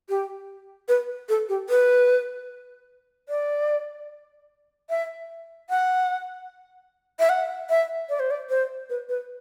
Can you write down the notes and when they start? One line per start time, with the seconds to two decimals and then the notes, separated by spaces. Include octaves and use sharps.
0.09 G4
0.88 B4
1.29 A4
1.49 G4
1.69 B4
3.29 D5
4.90 E5
5.70 F#5
7.20 E5
7.29 F#5
7.70 E5
8.09 D5
8.20 C5
8.31 D5
8.49 C5
8.90 B4
9.09 B4